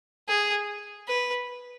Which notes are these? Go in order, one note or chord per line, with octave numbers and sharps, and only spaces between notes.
G#4
B4